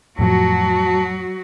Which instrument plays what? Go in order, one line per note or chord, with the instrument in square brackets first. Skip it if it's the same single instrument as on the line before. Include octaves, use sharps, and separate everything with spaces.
[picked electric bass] F2 A2 F3 [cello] F#3 F#4 [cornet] A5